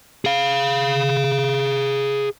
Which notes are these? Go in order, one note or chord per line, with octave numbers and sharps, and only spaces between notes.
G#4 F5